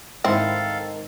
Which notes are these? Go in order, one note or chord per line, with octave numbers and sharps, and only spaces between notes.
G#2 D#3 C4 E4 A4 F5